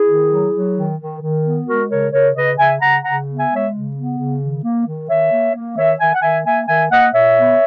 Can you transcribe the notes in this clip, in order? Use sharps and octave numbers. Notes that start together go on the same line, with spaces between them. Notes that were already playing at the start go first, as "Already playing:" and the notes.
Already playing: E4 G#4
D#3
F#3
F#3
D#3
D#3
D#3
B3
G#3 F#4 A#4
C#3 A#4 C#5
C#3 A#4 C#5
C#3 B4 D#5
C#3 E5 G#5
C#3 F#5 A#5
C#3 F#5 A#5
B3
E5 G#5
G#3
C#5 E5
C#3
B3
C#3
D#3
A#3
D#3
D#3 C#5 E5
A#3
A#3
D#3 C#5 E5
D#3 E5 G#5
F#5
D#3 E5 G#5
A#3 E5 G#5
D#3 E5 G#5
A#3 D#5 F#5
A#2 C#5 E5
B3